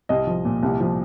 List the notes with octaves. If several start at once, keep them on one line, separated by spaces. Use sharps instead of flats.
C2 D#5
F3
A#2
C2
F3